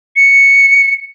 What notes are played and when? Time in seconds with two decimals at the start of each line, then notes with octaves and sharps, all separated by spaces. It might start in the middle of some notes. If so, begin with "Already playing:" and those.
0.16 C#7